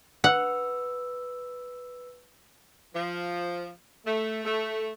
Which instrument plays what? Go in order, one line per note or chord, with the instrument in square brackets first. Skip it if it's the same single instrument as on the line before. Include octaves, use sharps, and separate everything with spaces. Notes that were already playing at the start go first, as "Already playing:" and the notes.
[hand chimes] B4 E6 [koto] F#5
[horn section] F3
A3
A3